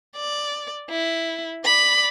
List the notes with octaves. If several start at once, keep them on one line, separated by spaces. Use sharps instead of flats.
D5
E4
D5 B5